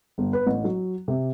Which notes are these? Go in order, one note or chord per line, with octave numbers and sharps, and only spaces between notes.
G1
B4
A1
F#3
C3